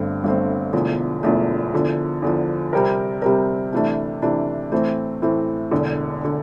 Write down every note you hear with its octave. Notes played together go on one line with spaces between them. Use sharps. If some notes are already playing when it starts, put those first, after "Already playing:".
Already playing: G1 G2 D3 A3 C4
G1 G2 D3 A3 C4
E1 E2 D3 F3 A3
E1 E2 D3 F3 A3
E2 D3 F3
E2 D3 F3
C3 G3 C4 G4 A#4
C3 G3 C4 G4 A#4
C3 E3 A3 D4
C3 E3 A3 D4
A2 E3 A3 C4
A2 E3 A3 C4
E1 E2 D3
D3